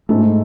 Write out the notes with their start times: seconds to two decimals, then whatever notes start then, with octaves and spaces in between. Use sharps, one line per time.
0.09 G#2 A3